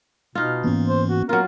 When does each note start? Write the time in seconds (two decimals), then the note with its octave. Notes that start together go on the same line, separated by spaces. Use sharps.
0.35 B2 D#4 F4 F6
0.63 G#2 E3 A#3 B3 C#4
0.88 C5
1.09 F#4
1.29 F#3 F4 A#4